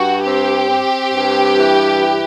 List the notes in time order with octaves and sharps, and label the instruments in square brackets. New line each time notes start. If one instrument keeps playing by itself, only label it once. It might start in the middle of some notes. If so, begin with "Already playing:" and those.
Already playing: [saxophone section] G2 [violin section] F#4
[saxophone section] C4 [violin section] G4
[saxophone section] C4
G2
E3
E3